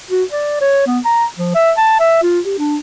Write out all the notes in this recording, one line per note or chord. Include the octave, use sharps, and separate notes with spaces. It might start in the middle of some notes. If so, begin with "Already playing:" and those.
F#4
D5
C#5
B3
A#5
F3
E5
A5
E5
F4
G4
D4